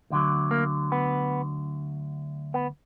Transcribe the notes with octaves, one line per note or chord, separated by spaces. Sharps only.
D2 D3 F#3
A#3
B3
B3